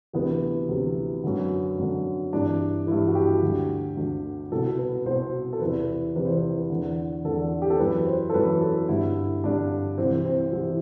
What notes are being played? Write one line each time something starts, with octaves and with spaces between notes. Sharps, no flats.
D2 C3 E3 B3
D2 C3 E3
F#2 D3
F#2 D3
G2 E3 D4
G2 E3 E4
F#4
G4
D2 D3
D2 D3
C2 B2 A4
B4
C2 B2 C5
A4
E2 C3 E3 B4
E2 C3 E3 B4
C5
B4
D3
E2
E2 D3 A4
G4
A4
F#2 E3 B4
C5
A4
F#2 E3 B4
A4
G2 D3 E4
G2 D3 D4
C2 C3 E3 C4
C4
C2 C3 E3